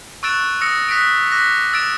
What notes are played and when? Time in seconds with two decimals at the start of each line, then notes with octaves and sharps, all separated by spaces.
0.23 C#6 E6 F#6 A6 D7 E7
0.61 D#6 E6 A#6 C#7
0.89 D#6 F#6 B6 C#7 D7
1.31 D6 F#6 A#6 B6
1.73 E6 A6 D7 E7